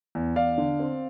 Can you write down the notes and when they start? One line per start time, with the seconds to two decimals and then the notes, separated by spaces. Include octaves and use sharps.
0.15 E2
0.36 E2 D5 F5
0.58 D3
0.79 C4